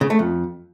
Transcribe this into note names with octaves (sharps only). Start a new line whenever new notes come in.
C#3
A3
F2